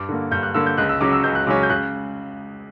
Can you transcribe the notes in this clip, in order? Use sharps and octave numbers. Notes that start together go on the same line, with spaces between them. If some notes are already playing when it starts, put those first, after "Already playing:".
Already playing: G2 D6
D3 A#3
G2 G6
F#6
D3 A#3 E6
G6
C#2 F#6
E6
C#3 F#3 C#4 D6
E6
C#2 G6
F#6
C#3 F#3 C#4 D6
G6
C#3 F#6